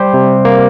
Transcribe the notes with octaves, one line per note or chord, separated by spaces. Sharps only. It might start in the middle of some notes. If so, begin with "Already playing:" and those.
Already playing: G3 G4 C5
C3
A#3